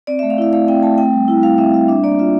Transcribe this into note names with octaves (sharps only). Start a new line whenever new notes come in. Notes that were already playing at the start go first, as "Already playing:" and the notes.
C4 D5
A3 E5
F5
E4 E5
A3 F5
C4 G5
A3 A5
C4 G5
G3
E4
G3 F5
C4 E5
G3 E5
D4 E5
A#3 D5
F4 E5